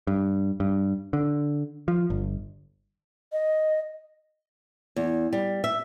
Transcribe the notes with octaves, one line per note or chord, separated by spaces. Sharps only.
G2
G2
D3
F3
G1
D#5
E2
G3
E5